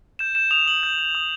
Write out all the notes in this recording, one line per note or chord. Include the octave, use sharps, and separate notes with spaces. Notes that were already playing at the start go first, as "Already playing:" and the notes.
G6 E7
G6 E7
D#6 F7
D#6 F#7
G6
G6
D#6